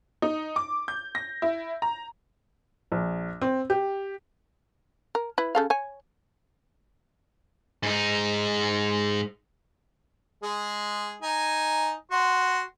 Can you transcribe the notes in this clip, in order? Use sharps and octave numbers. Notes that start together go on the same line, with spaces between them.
D#4
D6
G6
A#6
E4
A#5
A#1
C4
G4
A#4
E4 B4
C#3 A4 F5
C#5 G#5
G#2 D#4
G#3 G#4
D#4 G#5
F#4 C6